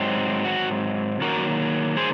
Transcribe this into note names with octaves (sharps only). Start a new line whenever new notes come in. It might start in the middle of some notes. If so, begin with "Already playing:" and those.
Already playing: G#2 F#3 C4
F#4
D#3 F#3 A#3 F#4 A#4
G#4 C5